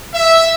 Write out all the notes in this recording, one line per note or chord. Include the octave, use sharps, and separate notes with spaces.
E5